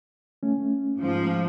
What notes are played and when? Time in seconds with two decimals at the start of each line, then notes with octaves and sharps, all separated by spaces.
0.43 A3 C#4
0.97 G#2 F3